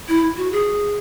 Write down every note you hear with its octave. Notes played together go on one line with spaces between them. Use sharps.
E4
F#4
G#4